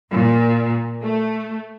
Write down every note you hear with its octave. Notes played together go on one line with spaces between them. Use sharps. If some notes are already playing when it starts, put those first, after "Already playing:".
A#2
A3